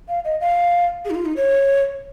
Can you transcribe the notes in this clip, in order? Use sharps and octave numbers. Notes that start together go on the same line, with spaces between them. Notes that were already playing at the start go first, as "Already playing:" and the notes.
F5
D#5
F5
G#4
D#4
F4
D#4
C#5